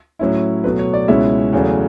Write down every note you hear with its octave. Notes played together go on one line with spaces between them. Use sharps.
A2 F#3 C#4 E4
B2 F#3 A3 B4
C#5
D5
C#2 B2 G#3 C#4 E4 E5
E2 C#3 F#3 A3